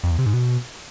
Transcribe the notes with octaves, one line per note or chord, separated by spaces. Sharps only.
F2
E2
C3
G#2
B2